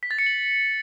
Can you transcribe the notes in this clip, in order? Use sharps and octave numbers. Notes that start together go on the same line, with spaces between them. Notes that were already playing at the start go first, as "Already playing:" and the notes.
B6
A6
C#7
F#7